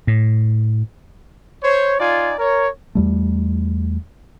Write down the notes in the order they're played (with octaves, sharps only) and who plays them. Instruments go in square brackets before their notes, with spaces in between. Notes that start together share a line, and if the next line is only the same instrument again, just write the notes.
[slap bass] A2
[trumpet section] C5 C#5
D#4 F4 D5 G#5
A#4 C#5
[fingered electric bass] E2 G3 A3